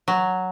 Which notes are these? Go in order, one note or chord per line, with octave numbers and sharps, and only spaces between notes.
F#3